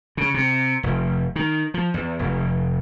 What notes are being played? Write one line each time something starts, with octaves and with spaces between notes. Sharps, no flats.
C#3
C3
F1
D#3
F3
E2
F1